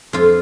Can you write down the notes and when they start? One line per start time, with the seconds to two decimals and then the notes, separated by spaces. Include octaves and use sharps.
0.13 F2 F4